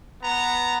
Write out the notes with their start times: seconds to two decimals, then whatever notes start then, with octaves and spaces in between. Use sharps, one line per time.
0.23 B3 A#5